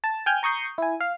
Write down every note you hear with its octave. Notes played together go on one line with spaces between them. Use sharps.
A5
G5 G#5 F6 G6
A#5 C#6 D#6 G6 C7
E4 G#5
F5